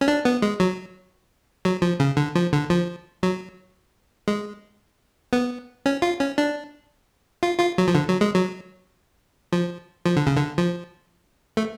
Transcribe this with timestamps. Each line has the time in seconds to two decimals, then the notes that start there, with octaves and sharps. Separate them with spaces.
0.01 C#4
0.08 D4
0.25 B3
0.42 G#3
0.60 F#3
1.65 F#3
1.82 F3
2.00 C#3
2.17 D3
2.35 F3
2.53 D3
2.70 F3
3.23 F#3
4.28 G#3
5.33 B3
5.86 C#4
6.02 F4
6.20 C#4
6.38 D4
7.43 F4
7.60 F4
7.78 F#3
7.88 F3
7.95 D3
8.09 F#3
8.21 G#3
8.35 F#3
9.52 F3
10.06 F3
10.17 D3
10.27 C#3
10.37 D3
10.58 F3
11.57 A3